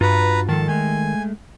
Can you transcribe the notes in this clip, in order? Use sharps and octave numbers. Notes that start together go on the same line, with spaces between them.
G2 F4 F#4 B4 A#5
G#2 D#3 F3 A4 A5
G#3 A3 G#5